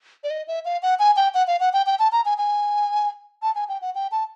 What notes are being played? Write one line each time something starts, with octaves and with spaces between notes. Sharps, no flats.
D5
D#5
E5
F5
F#5
G#5
G5
F#5
F5
F#5
G5
G5
A5
A#5
G#5
G#5
A5
G#5
G5
F#5
G5
A5